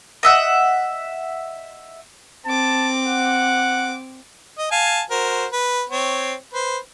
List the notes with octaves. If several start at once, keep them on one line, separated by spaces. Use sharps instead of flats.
D#5 E5 F#5
C4 A5 D6
F#5
D#5
F5 G#5 A5
F#4 A#4 C5
B4
C4 C#5
B4 C5